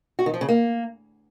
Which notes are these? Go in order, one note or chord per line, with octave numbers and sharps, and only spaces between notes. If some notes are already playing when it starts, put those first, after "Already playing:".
F#4
D#3
F3
C#3
A#3